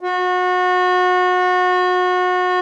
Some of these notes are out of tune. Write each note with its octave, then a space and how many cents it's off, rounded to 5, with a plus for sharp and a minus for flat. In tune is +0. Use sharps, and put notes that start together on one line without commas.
F#4 -30